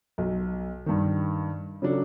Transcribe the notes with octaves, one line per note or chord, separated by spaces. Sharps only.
B1
G2 D#3
C#3 F#3 D4 A4